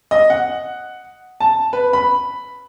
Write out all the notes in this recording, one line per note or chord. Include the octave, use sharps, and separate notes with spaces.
D#5
F#5
A5
B4
B5